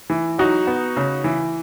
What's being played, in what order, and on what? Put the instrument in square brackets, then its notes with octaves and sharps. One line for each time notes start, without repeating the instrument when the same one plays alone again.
[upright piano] E3
F#3 D#4 F#4
B3
C#3
E3